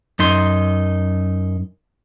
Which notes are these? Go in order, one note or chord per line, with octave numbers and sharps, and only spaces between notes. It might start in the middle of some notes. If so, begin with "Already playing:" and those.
F#2 D#4 C6